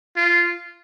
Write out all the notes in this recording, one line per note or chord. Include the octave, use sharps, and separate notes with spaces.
F4